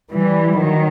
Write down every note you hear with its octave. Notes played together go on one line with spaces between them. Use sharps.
E3 G3
D#3 F#3